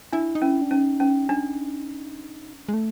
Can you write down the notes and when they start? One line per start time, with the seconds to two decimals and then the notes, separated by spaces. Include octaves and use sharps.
0.13 D4 E4
0.35 D#4
0.42 C#4 E4
0.62 D4
0.71 C#4 D#4
1.00 C#4
1.29 D4
2.69 G#3
2.74 A3